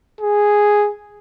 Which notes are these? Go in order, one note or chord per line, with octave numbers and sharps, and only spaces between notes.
G#4